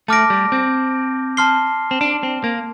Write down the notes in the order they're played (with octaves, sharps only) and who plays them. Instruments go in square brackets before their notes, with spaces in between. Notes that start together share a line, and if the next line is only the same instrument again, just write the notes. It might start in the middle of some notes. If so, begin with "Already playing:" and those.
[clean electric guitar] A3 [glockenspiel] A5 D6 F6 A#6 D7
[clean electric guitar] G3
C4
[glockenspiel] A5 C6 F6 C7 G7
[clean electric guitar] C4
D4
C4
A#3